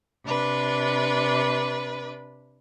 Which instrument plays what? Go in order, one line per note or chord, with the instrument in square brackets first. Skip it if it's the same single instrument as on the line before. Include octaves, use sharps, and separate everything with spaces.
[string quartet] C3 D4 B4 B5